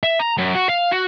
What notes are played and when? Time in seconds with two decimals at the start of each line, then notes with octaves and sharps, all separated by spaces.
0.04 E5
0.19 A#5
0.37 F#2
0.55 F#4
0.69 F5
0.92 F#4